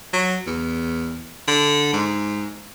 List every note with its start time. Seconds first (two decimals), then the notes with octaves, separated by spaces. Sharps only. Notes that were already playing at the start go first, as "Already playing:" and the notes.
0.13 F#3
0.47 E2
1.47 D3
1.93 G#2